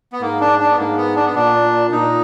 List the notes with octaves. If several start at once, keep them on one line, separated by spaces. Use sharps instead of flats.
B3
G#2 A#3
D4
D4
B3
G#2 A#3
B3
D4
B3
A#2 D4
A#2 D#4